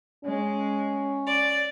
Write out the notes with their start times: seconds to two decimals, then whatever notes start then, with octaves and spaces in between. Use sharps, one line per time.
0.24 G#3 C#4
1.25 D5